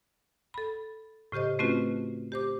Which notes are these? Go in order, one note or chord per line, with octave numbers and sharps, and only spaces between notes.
A4 B5
A2 C#3 G4 C5 D#5
A3 C4 C#4 F4 F#4 B4
G4 C5 D6